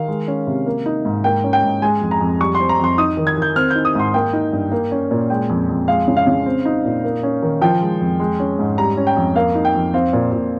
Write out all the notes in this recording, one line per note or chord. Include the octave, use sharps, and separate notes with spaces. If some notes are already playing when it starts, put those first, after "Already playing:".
Already playing: D#3 F5
G#3
C#4
C3
A#3
D#4
G#2
A#3 G5
C#4
G5
G#2
G#3 G#5
F2
A#5
F2
G3 C#6
C6
C4
A#5
F2 C6
D#4 D#6
D#3
G#6
D#3
G6
C4 F6
D#4 G6
D#6
G#2 C6
A#3 G5
D#4
G2
A#3
C#4
A#2
G#3 G5
F2
F2
G#3 F5
C#3
F5
C#3
C4
D#4
A#2
A#3
C#4
D#3
F3 G5
G#3
F2
G#3
C#4
G#2
G3 A#5
C#4
G5
F2
A#3 F5
D#4
G5
F2
C4 F5
A#2
A#2